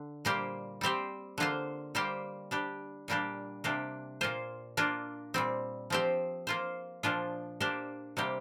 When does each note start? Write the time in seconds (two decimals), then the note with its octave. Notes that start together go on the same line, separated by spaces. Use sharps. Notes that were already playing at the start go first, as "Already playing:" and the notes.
Already playing: D3
0.25 A#2 G3 A#3 G4 C5
0.81 G3 C4 G4 C5
1.38 D3 A#3 F4 C5
1.95 G3 A#3 G4 C5
2.51 G3 D4 G4
3.08 A#2 G3 A#3 D4 G4
3.64 C3 A#3 D4 G4
4.21 A#2 A#3 F4 C5
4.77 A#3 D4 F4
5.34 A#2 G3 C4
5.90 F3 C4 G4 C5
6.47 A#3 F4 C5
7.03 A#2 F3 D4 F4
7.60 A#3 D4 G4 C5
8.17 C3 G3 A#3 G4